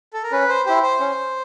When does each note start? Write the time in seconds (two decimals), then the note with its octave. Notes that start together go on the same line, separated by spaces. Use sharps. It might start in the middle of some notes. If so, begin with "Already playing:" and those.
0.13 A4
0.23 A#4
0.32 C#4 B4
0.49 C5
0.66 E4 G4 C5
0.83 C5
1.00 C#4